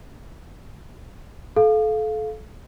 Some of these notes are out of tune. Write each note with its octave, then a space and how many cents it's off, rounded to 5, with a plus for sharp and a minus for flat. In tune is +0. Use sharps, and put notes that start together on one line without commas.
A4 -30 F5 +0